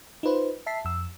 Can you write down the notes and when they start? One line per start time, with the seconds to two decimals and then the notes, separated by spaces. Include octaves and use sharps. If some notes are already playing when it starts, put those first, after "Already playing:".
0.23 D#4 F4 B4 C5
0.66 E5 A5 B6 C7
0.85 F2 E6